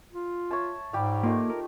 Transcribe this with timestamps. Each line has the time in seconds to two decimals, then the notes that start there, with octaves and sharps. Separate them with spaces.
0.12 F4
0.51 C#5 E5 A5
0.93 G#2 G3 G4 F5
1.23 A3 A#3 D#4 F4
1.50 A#4